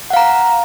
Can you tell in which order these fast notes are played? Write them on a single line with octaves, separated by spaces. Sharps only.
F#5 F5 A#5